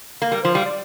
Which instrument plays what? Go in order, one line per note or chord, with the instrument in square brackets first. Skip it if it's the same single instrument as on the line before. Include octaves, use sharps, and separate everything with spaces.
[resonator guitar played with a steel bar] A#3
[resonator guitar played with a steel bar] G3 [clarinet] A#4
[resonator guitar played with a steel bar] F3 [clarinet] C5
[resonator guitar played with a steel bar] G3 [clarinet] F5
[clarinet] D5